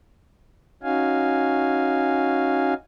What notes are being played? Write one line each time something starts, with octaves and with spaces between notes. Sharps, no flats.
C#4 D#4 F#4 F5 G#5